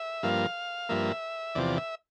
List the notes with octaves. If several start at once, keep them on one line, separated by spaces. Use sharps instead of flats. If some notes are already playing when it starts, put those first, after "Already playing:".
Already playing: E5
G2 F3 A#3 F5
G2 F3 A#3 E5
E2 C3 F3 D5
E5